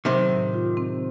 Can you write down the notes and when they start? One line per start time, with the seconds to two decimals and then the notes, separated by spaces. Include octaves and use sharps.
0.05 C3 D#3 F#3
0.29 A2
0.54 F4
0.77 C4